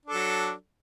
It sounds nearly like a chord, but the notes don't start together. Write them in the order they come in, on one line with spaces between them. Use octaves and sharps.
D4 A4 F#3